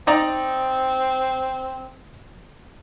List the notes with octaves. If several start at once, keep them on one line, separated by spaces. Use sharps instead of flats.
C4 D#4 D5 A#5